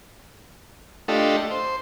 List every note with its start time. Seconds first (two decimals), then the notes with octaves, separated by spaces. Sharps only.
1.08 A3 D4 F4 G4 A4 D#5
1.51 C5